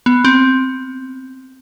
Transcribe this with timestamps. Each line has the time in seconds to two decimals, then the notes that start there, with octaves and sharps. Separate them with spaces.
0.06 B3
0.25 C4